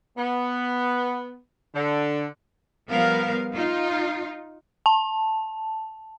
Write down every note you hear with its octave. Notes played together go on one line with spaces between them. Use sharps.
B3
D3
F3 G3 B3 A#4 F5
D#4 F4
A5